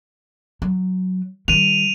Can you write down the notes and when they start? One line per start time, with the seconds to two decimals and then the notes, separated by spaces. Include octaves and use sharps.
0.62 F#3
1.48 D#3 G3 D#7 F7